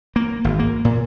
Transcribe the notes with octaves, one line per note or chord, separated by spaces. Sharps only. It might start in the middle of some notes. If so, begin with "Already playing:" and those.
A#3
G#1
A#3
A#2